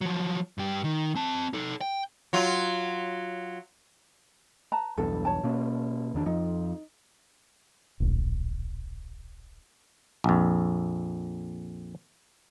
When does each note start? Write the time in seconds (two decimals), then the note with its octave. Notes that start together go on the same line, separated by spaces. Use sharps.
0.01 F3 F#3
0.58 G2 G4
0.84 D#3
1.15 C4 A5
1.53 D#4 A4
1.81 G5
2.33 F#3 F4
4.72 B4 A5 A#5
4.98 B1 E2 G2 A4
5.25 C#5 A5
5.43 B2 A#3 C#4
6.14 E2 D#3 D4
6.26 F2 F3 D#4
8.00 D1 A#1
10.24 A#1 F2